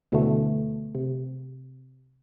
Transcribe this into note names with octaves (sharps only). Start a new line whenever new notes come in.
D2 B2 D3 E3 A3
C3